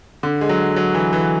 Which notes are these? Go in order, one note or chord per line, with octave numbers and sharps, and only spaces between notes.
D3
G#3
F#3
F#3
E3
E3